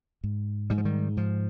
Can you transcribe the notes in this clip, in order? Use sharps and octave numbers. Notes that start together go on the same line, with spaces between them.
G#2
G#2 G3
F3
D#3 G3
G#2 F3